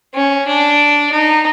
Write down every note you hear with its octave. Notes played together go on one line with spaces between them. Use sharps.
C#4
D4
D#4